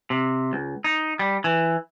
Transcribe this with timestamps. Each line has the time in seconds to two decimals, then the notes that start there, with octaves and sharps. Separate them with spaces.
0.10 C3
0.53 C#2
0.84 D#4
1.19 G3
1.44 E3